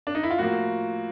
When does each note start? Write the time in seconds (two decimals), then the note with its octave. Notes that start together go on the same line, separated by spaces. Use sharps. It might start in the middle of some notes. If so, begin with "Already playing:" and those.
0.07 D4
0.15 D#4
0.23 E4
0.31 F4
0.38 A2 F3 A#3 F#4